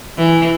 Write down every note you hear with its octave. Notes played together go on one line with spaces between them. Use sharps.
E3